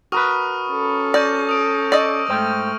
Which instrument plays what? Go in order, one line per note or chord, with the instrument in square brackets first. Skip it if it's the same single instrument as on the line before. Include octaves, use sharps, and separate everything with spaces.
[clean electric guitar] F#4 A#4 B4 [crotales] C#6 D#6 F6
[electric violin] C#4 A4
[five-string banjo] D5 [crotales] C#6 G6 A#6
[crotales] D#6 D7
[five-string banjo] D5 D#5 [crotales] C#6 E6
[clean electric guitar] G#2 C5 G5 [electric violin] A3 F6